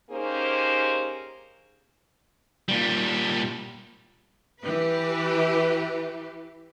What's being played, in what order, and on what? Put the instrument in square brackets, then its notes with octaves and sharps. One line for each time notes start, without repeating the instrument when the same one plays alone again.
[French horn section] A#3 C#4 D#4 G4 G#4 C5
[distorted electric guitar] A#2 G3
[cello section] E3 G4 B4